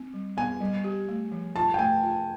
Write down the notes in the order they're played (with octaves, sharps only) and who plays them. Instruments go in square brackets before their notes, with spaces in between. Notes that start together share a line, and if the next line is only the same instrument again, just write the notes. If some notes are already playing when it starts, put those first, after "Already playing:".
Already playing: [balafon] C4
G3
[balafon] B3 [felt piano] G#5
[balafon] G3
G4
A3
F3
[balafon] F4 [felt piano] A5
[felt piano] G5
[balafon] A3 [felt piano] G#5
[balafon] F4